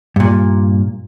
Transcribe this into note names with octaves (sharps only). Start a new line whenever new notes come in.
G2 A#2